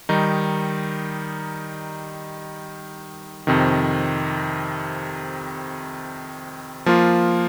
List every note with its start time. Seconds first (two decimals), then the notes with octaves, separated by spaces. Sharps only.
0.09 D#3 G3 D#4
3.47 F2 C3 D#3
6.86 F3 A#3 F4